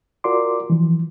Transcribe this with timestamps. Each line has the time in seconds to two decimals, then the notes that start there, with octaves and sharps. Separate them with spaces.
0.24 F4 F#4 A#4 D5 C6 D6
0.70 E3 F3